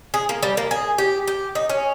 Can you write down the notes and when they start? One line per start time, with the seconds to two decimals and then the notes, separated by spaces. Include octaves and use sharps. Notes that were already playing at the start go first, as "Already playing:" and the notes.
0.14 G#4
0.29 A#3
0.43 G3
0.57 A#3
0.71 G#4
0.98 G4
1.27 G4
1.55 D#4
1.69 C#4